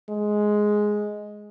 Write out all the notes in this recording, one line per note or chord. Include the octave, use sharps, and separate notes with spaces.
G#3